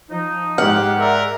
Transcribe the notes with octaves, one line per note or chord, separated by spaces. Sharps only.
F3 D#4
G#2 G4 F#5 F6
G#4 A#4 D5 E5